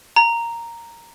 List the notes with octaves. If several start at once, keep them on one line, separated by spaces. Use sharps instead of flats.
A#5